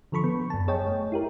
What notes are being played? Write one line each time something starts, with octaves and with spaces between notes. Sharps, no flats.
D3 F3 A4 B5 C#6
B3
F#2 A5
G#4 C#5 D#5 G5
A3
E4 G4 A#4